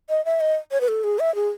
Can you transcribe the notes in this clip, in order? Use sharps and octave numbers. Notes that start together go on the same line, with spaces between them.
D#5
E5
D#5
C#5
B4
A4
G#4
E5
G#4